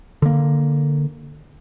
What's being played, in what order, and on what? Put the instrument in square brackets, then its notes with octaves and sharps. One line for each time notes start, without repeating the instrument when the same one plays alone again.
[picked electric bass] D3 A#3